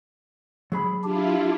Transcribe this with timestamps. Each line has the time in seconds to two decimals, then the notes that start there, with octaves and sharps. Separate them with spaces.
0.72 F#3 G#4 B5
1.04 D4 E4 F4 G4